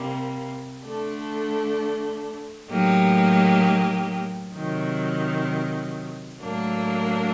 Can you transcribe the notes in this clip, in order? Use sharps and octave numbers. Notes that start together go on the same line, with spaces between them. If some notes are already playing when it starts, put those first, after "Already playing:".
Already playing: C3 G3 A#3
D3 A3 D4 A4
A2 F#3 A#3 D#4 G4
C3 D#3 F#3
A2 F#3 A#3 D4